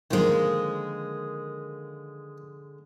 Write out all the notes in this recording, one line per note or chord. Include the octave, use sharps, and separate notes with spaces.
D3 D#3 F3 G#3 A#3